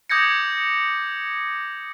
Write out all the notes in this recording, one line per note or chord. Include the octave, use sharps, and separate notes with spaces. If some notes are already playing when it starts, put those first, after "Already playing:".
D6 D#6 G6 G#6 A#6 C#7